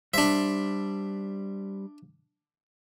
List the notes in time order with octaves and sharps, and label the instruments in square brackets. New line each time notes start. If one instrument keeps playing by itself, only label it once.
[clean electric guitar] G3 C5 [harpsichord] D4 E5